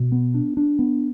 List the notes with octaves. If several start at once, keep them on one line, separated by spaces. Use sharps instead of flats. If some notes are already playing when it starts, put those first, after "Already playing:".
Already playing: B2
B3
D4
D4
B3